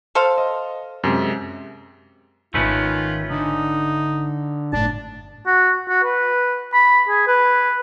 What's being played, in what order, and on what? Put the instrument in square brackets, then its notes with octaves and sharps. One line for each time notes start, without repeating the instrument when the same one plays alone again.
[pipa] A4 C5 F5
[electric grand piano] D#5
F#2 C3 G#3
[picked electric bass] D1 G#1 [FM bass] D#3 [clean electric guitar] A3 C#4 B4 [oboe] F4
[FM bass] D3 [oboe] D#4
[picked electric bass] G1 A2 [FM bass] D4 [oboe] A5
[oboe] F#4
F#4
B4
B5
G#4
B4